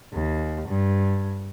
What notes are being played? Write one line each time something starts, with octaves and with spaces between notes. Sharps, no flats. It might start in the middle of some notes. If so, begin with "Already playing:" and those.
D#2
G2